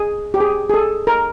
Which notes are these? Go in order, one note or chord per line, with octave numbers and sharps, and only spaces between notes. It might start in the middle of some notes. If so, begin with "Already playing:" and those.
Already playing: G#4
G4
G#4
G#4
A4
A#4